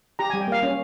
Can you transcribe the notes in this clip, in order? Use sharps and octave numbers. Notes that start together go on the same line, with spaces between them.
G4 A#5
G3 G#5
G5
A#3 F5
C#4